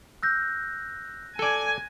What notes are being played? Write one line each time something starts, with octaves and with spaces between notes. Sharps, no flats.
E6 F#6 G6 A#6
A4 D5 G#5